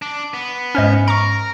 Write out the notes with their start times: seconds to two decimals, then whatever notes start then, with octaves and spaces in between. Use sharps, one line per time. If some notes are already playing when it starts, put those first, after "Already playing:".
0.02 D4
0.34 B3
0.75 G#2 C#4 C5 D#5 F6
1.08 A#4 A#5 C#6